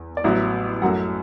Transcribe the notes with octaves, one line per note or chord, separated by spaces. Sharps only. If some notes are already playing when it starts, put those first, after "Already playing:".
Already playing: E2
D5
A1 A2 F#3 B3 E5
F#2 F#3 A3 F#5